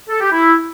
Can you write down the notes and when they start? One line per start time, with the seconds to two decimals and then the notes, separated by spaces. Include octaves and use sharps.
0.10 A4
0.21 G4
0.32 E4